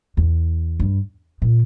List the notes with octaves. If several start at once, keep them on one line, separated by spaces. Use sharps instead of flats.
E2
G2
A#2